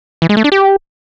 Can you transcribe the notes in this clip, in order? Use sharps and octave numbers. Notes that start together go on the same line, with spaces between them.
E3
G#3
A3
D4
G4